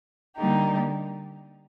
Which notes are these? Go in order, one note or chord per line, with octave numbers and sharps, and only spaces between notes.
D3 G3 A#3 D#4 G4